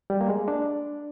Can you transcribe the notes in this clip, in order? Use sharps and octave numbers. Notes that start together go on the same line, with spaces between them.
G3
A#3
G#3
D4